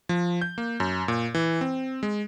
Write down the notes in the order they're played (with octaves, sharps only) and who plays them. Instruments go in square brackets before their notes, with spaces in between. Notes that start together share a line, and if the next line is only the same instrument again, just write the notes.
[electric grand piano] F3
G6
A#3
F#2
A#2
E3
C4
G#3